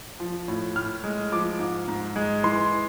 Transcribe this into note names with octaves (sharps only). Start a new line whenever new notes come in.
F3
A2
A2 F6
G#3
F3 D6
G#2
G#2
G#3
E3 C6